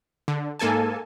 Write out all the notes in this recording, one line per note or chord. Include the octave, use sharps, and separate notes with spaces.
D3
G#2 A#3 A4 G#5 A5